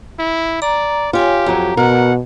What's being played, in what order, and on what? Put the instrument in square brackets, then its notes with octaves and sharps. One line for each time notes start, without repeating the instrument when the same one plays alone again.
[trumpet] E4
[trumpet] D5 [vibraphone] A#5
[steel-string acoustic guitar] F4 [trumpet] G4 [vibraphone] C#5 G#5
[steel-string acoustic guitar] F2 F#3 [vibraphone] A#5
[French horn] B2 [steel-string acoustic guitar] A#4 [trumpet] F#5